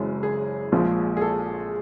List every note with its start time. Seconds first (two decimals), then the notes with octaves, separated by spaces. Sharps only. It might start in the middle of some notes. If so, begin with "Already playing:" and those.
Already playing: F#1 F#2 C#3 E3 G#3
0.23 G#4
0.72 A#1 A#2 F3 G#3
1.17 G#4
1.21 A4